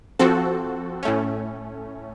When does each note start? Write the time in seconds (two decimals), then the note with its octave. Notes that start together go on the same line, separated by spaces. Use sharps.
0.19 F3 C4 F#4 A4
1.03 A2 A3 C#4